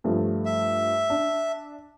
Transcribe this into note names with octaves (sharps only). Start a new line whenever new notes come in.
G2 F3 A3
E5
D4